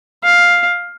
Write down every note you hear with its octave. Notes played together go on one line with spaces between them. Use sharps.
F5